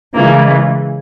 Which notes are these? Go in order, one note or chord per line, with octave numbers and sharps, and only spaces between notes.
C#3 E3 G#3 A#3